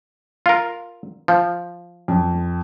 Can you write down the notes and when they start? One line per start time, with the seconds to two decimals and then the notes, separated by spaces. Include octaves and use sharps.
0.46 F4 A#4
1.28 F3
2.08 F2